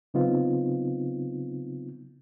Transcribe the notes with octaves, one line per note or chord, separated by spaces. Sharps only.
C#3 F#3 B3 C4 D#4 F4